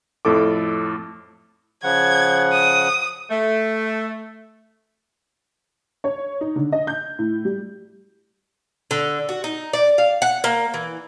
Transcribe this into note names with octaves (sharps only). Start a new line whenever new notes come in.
F2 A2 A4 D6
C#3 F3 F#5 G#6
D#6
A3
C#5
D#4
D3
D#5
G6
A2
G3
D3
F#4
D#4
D5
F5
F#5
A#3
E3